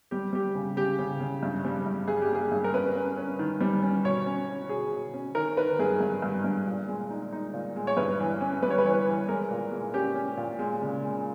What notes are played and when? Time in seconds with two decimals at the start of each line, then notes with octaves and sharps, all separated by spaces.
0.11 G3 G4
0.33 G3 G4
0.55 C#3
0.76 C#3 G4
0.99 C#3
1.20 C#3
1.43 G2
1.65 G3
1.86 G2
2.08 G2 G#4
2.22 G4
2.30 A#3 G#4
2.52 G2
2.64 A#4
2.74 C#4 B4
2.95 C#4
3.17 C#4
3.39 D#3
3.61 G3
3.83 C#4
4.04 B2 C#5
4.26 C#4
4.49 C#4
4.69 B2 G#4
4.91 B2
5.14 C#4
5.35 D#3 A#4
5.57 D#3 B4
5.79 G2 G#4
6.00 G2
6.22 G2
6.44 G2
6.66 A#2
6.88 G#3
7.10 D#4
7.32 D#4
7.54 A#2
7.76 G#3
7.87 C#5
7.97 G2 B4
8.19 E3
8.41 C#4
8.62 G3 B4
8.70 C#5
8.78 B4
8.84 E3 C#5
8.93 B4
9.07 E3
9.28 G#3 A#4
9.51 A#2
9.72 G#3
9.94 C#4 G4
10.15 C#4
10.37 A#2
10.59 G#3
10.82 C#3
11.04 G#3